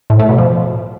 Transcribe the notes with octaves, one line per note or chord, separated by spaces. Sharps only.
A2
A3
B2
F3